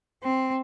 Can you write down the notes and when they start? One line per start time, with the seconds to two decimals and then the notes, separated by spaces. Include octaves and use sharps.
0.24 C4